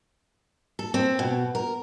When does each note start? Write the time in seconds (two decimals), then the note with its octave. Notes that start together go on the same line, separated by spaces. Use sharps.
0.79 A4
0.94 C4
1.19 B2
1.55 A#4